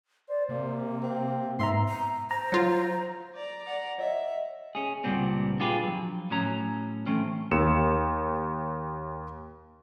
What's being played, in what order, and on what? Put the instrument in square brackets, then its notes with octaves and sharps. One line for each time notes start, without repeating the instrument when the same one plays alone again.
[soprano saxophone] C5 [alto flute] D5
[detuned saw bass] C3 [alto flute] A#3
[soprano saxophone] C4
[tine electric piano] G#2 E5 A#5 [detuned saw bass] B3 [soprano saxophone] C6
[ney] A#5
[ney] C5 [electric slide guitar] A#5
[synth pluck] F#3 F4
[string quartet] D5 A#5
D5 F#5 A#5
[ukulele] C#5 D#5 F#5 [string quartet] E5
[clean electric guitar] C#4 G#4
C#2 A#2 G3 B3 C4 D4
D4 F4 G4 G#4 B4
F3 F#3
A2 F#3 C#4 A#5
E3 A3 C4 C#4
[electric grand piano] D#2 E6 C#7 E7